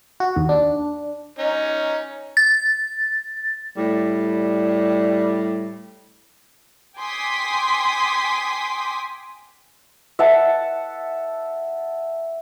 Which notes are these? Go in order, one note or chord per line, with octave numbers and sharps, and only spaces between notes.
F#4
D#2
D4
C#4 D#4
A6
A2 G3
G5 G#5 C6 D6 D#6 B6
E5 F#5 A5